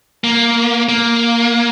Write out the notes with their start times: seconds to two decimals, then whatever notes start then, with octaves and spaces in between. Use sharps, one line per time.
0.24 A#3
0.89 A#3